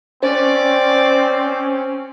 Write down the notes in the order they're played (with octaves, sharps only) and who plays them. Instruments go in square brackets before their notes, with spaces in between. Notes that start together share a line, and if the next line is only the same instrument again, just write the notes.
[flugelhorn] C4 [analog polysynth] C#4 [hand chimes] C5 [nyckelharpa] D5